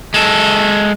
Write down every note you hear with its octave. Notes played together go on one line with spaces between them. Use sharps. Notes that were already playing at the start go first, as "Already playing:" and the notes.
G#3 A4